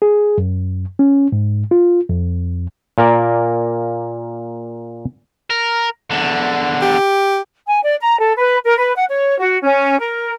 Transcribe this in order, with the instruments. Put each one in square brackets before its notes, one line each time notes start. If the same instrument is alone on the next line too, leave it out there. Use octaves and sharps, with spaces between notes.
[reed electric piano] G#4
F#2
C#4
G#2
F4
F2
[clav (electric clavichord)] A#2 A#3 A#4 D5
[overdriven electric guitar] A#4
E2 D3
[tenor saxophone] G4
[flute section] G#5
D5
A#5
A4
B4
A#4
B4
F#5
C#5
F#4
C#4
A#4